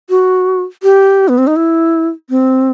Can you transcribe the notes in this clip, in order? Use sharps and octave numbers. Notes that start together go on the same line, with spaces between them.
F#4
G4
B3
C4
D#4
E4
C4